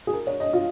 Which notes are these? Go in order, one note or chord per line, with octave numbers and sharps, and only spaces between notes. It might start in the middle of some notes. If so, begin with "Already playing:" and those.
G#4
A#4
C#5
D#5
F4